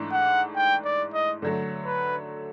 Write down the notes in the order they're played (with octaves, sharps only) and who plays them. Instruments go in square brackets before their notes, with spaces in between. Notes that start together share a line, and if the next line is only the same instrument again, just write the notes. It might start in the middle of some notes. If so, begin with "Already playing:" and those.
Already playing: [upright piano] G#2 E3 A3 D4
[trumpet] F#5
G5
D5
D#5
[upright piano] D3 F#3 A3
[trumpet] B4